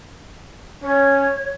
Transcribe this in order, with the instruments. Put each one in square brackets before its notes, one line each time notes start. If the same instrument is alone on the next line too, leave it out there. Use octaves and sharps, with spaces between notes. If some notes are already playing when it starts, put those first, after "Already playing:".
[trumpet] C#4 [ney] C#5